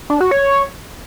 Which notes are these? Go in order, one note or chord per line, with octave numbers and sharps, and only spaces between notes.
D4
F#4
C#5